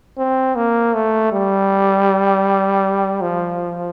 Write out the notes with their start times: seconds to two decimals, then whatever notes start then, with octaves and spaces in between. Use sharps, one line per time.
0.18 C4
0.56 A#3
0.94 A3
1.32 G3
3.21 F3